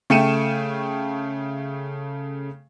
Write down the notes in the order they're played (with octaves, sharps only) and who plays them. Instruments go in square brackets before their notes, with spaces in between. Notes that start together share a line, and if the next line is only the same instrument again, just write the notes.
[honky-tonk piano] C#3 A3 G5 C#7 D#7 E7